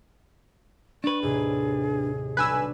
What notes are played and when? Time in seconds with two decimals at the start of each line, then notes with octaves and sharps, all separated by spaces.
1.04 D4 B4 C#6
1.22 D#2 A2 C3 G#4
2.37 B1 G3 D4 B4 G#5 E6